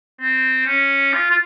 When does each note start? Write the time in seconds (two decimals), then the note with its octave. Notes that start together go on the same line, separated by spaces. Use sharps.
0.21 C4
0.67 C#4
1.13 F4
1.31 F4